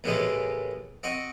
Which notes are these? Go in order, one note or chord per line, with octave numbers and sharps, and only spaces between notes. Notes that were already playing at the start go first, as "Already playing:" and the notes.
D#2 A2 C#3 E3 G#3 A3
C4 F#4 D#5